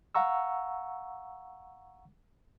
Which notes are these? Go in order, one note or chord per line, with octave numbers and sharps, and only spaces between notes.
F5 F#5 A#5 C#6 E6